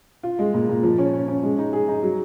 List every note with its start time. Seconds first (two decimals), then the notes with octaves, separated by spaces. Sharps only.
0.23 F4
0.39 G#3
0.54 A#2
0.69 A#2
0.83 F3
0.98 C#4
1.14 C#4
1.28 C#4
1.43 G#3
1.58 D#4
1.73 G#4
1.88 D#4
2.03 F#3